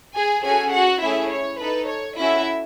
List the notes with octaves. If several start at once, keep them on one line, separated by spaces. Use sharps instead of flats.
G#4 G#5
C#4 F#4 G#4 A4 G#5
F#4 F#5
A3 C#4 E4 G#4 E5
C#5
D#4 A4 B4
C#5
C#4 E4 F#4 A4 E5